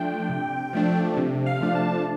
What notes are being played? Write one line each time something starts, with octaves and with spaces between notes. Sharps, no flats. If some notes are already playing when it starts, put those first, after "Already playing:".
Already playing: F3 A3 D4 G5
C3
F3 A3 D4
C3
F5
F3 A3 D4
A5